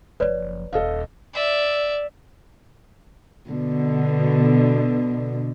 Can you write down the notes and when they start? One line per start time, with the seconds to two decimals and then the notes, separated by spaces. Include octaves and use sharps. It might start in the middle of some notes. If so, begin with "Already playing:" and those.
0.20 F#1 F3 B4 C#5 D5
0.73 D#1 A4 D#5 F5
1.33 D5 E5
3.47 B2 D3